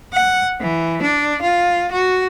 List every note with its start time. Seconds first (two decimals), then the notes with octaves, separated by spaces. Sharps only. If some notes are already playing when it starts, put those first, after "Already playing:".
0.13 F#5
0.61 E3
1.02 D4
1.42 F4
1.91 F#4